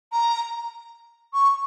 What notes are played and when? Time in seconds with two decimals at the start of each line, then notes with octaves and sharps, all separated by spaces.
0.13 A#5
1.34 C#6